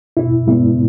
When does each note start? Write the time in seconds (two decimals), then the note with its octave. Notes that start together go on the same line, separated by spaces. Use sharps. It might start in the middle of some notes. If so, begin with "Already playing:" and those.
0.17 B2 E4
0.47 G#3 B3 E4